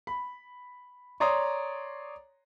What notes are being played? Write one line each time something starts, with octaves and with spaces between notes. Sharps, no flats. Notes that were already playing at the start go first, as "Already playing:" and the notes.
B5
C#5 D5 A#5 C6 D#6